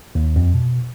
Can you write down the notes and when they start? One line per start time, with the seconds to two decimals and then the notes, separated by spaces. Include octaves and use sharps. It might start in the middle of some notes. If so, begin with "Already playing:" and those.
0.15 D#2
0.36 F2
0.54 B2